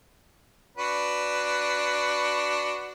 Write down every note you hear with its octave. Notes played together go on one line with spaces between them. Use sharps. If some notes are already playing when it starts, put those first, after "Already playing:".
D4 F#4 B4